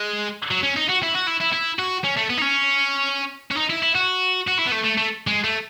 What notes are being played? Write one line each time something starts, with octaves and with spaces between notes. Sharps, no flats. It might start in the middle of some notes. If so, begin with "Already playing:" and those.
Already playing: G#3
F#3
C#4
D#4
F#4
E4
F#4
E4
E4
E4
F#4
C#4
A3
B3
D#4
C#4
C#4
D#4
E4
E4
F#4
F#4
E4
B3
A3
A3
A3
G#3
A3